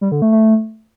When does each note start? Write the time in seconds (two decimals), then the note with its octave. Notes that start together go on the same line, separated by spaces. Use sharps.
0.01 G3
0.12 D3
0.22 A3
0.32 A3